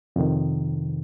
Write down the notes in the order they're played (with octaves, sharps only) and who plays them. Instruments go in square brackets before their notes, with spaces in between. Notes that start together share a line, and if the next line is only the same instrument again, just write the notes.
[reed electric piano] F2 C3 D#3